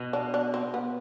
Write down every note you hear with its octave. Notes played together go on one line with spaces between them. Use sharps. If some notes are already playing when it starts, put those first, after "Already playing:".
Already playing: B2
D4
D4
C4
B3